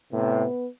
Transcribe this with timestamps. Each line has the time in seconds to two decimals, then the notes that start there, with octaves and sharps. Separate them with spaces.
0.12 A2 C3 B3